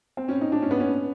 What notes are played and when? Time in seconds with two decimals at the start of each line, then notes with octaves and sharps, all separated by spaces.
0.17 C4
0.29 C#4
0.41 D#4
0.52 D4
0.62 C#4
0.71 B3
0.80 C#4